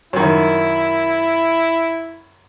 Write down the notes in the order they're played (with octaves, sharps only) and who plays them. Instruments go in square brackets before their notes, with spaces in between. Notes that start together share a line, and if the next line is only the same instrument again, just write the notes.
[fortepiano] F#2 D#3 [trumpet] E4